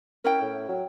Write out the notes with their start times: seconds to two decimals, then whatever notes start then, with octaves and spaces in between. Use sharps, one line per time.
0.25 C#4 E4 A#4 G5
0.41 A2
0.68 F#3